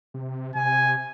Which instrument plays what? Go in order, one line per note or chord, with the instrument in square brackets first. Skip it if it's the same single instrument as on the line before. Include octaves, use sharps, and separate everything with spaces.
[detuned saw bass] C3
[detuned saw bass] C3 [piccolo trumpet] G#5